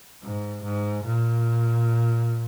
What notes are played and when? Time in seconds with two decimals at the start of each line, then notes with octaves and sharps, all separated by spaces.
0.23 G#2
0.64 G#2
1.05 A#2